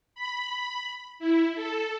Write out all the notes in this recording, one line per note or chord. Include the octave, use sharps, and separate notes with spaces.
B5
E4
A4